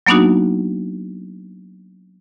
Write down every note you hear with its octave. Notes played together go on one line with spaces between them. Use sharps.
F#3 A#3 B3 D4 D#4 F#4